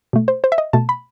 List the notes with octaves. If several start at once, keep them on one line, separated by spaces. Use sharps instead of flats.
B2 A3
C5
C5
E5
D#5
B2 A3 A5
B5